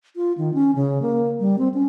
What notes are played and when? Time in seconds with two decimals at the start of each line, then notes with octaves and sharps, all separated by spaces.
0.16 F4
0.38 D#3
0.54 C#4
0.75 C#3
1.02 A#3
1.40 G3
1.58 C4
1.74 C#4